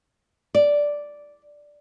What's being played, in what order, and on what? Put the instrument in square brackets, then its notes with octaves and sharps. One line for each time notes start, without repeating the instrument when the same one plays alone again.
[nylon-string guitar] D5